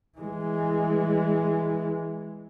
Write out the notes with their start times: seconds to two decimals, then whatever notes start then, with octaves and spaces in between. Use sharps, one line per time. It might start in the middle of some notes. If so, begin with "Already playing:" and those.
0.18 E3 G#3